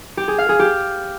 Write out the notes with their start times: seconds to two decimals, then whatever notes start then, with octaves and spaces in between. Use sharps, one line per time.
0.17 G4
0.28 G#4
0.38 F5
0.49 G#4
0.59 G4